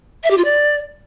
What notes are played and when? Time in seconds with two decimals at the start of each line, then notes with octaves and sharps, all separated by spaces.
0.24 E5
0.31 G4
0.38 F4
0.45 D5